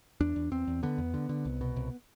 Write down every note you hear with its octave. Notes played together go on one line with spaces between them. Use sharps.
E2 D4
E2
E2 C4
E2
D3 B3
E2
D3
D3
C2
B2
C2